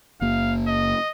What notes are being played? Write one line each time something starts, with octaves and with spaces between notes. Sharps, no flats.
F#1 A#3 F5
D#5